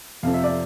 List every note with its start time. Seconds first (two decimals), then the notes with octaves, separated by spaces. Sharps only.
0.23 F2 C3 F3 C4 F5
0.34 E5
0.43 D5